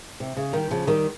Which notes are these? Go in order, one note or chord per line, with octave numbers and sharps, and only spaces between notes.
C3
C#3
D#3 G3
C#3 F3
D#3 G3